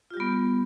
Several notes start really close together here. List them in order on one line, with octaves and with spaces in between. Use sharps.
F4 G4 G3 B3